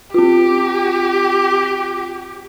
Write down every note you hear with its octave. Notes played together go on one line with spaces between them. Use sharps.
C4 F4 G4